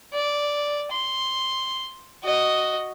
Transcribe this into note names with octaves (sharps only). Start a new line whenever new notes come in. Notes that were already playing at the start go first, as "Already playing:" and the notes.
D5
C6
F#4 D#5